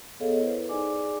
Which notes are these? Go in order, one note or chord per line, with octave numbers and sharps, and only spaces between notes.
B3 G#4 A4 C#5 D#5 F5
E4 B4 C5
D#4 G#4 D5 G#5 D6